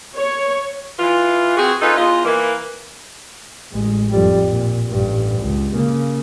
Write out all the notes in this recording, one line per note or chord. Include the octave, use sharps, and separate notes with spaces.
C#5
E3 F4
C4 F#4 G#4
C#4 D#4 F4 A4 B4
E2 F4 D#5
E3 A#3
A1 G#3
F2 G3
A#2
A1 G2
C#2
C#3 A#3